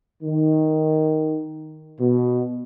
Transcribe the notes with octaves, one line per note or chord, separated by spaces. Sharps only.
D#3
B2